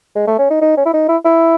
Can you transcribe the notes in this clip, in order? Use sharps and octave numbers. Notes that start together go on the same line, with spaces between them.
G#3
A3
C#4
D#4
D#4
C#4
E4
D#4
E4
E4